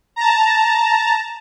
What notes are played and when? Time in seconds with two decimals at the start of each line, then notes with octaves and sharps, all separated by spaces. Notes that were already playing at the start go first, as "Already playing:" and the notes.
0.16 A5 A#5